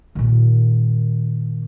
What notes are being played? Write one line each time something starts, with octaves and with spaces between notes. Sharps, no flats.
A#2 D#3